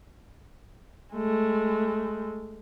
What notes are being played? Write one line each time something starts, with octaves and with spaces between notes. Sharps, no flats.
G#3 A3